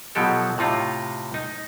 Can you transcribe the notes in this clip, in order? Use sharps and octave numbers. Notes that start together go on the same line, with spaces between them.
B2 F3 F#3 G4 A4
A2 C3 D#4 F4
D#4